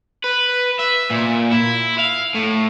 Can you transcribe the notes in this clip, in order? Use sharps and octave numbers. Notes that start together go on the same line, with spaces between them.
B4
E5
A#2
E4
F5
A2